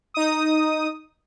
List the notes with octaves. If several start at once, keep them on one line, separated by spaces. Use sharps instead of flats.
D#4 D#6